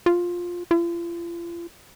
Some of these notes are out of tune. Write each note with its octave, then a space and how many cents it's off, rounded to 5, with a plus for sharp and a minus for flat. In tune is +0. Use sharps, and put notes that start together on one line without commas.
F4 +10
F4 -40